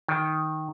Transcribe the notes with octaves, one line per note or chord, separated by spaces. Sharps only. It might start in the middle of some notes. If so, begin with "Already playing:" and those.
D#3